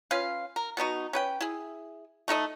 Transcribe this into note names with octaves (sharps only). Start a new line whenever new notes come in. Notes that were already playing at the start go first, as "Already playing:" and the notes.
C#4 F4 B4 F5
A#4
B2 B3 D#4 F#4
C#4 B4 G5
E4 G#4
A3 D#4 A4 D#5